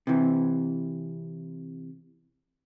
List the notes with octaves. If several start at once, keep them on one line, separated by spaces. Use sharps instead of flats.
C3 E3